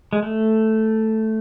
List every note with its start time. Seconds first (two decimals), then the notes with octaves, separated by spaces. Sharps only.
0.13 G#3
0.23 A3